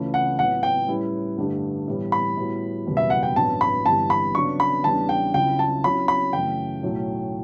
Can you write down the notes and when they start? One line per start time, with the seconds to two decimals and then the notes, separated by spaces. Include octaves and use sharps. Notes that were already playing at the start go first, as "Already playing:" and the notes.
Already playing: C#2 C#3 E3 A3 E4
0.14 F#5
0.39 A2 F#3 B3 F#5
0.63 G5
0.88 A2 G3 C#4 E4 B4
1.38 G2 D3 A3 D4 G4
1.88 A2 E3 G3 B3
2.12 B5
2.37 A2 G3 B3 F#4
2.87 F#1 E2 B2 G3
2.97 E5
3.10 F#5
3.23 G5
3.36 A1 G2 F#3 B3 E4 A5
3.61 B5
3.86 G1 G2 E3 G3 A5
4.10 B5
4.34 C#3 F#3 B3 D4 C#6
4.60 B5
4.84 E2 C#3 G3 B3 D4 A5
5.09 G5
5.34 C#2 C#3 F#3 C#4 E4 G5
5.59 A5
5.84 C#3 F#3 C#4 E4 B5
6.08 B5
6.33 F#2 C#3 E3 A3 G5
6.83 B1 A2 F#3 A3